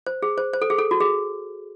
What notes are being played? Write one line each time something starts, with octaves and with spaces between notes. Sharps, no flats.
C5
G#4
C5
C5
A4
G#4
A4
F#4
G#4